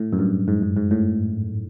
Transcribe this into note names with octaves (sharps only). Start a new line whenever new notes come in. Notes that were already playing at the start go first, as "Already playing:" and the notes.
Already playing: A2
F#2
G2
G#2
G#2
G#2
A2